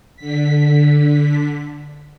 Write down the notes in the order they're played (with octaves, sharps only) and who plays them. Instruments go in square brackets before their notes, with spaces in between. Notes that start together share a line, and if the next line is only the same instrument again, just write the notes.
[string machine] D3 B6